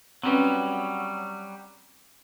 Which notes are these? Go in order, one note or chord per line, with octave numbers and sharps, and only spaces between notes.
F#3 G3 C4 C#4 B4